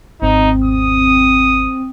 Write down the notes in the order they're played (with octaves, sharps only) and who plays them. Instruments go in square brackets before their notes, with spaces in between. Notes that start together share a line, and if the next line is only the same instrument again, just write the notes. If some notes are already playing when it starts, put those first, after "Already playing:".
[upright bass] G#1 E2 [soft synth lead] C4 [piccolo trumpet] D#4
[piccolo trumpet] D#6